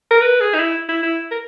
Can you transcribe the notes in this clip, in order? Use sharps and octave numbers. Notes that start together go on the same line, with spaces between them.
A#4
B4
G#4
D#4
E4
E4
E4
A#4